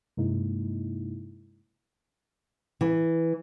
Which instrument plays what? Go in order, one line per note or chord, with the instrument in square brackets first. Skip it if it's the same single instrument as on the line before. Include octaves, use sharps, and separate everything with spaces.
[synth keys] G2 C3 G#3 A#3 D#4 E4
[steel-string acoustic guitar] E3